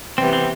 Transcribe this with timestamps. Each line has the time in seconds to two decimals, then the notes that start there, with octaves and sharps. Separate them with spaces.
0.18 C3 E3 G3 B3 C4
0.33 C4